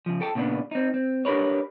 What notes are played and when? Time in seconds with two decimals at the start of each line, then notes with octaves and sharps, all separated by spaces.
0.06 C#3 F3
0.21 A4 G5 A5
0.35 A#2 C#3 B3 C#4 D4
0.71 C4 D#4
0.94 C4
1.25 D4 G4 A#4 B4 C#5